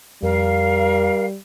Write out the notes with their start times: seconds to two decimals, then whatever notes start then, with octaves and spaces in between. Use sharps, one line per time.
0.23 F2 G3 A#4 F5